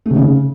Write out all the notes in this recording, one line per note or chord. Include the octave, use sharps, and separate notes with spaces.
A3
C3
C#3